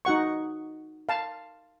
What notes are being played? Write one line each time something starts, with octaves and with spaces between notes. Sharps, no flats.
D#4 F#4 F#5 C#6
F5 A5